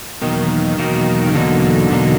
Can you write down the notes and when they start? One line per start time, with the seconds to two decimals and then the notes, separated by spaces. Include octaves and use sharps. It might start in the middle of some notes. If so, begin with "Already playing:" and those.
0.22 E2 B2 D#3 F#3 A#3 D#4
0.78 E2 B2 F#3 A#3 D#4
1.27 C#3
1.34 E2 B2 D3 F#3 A#3 D#4
1.90 E2 B2 F#3 A#3 D#4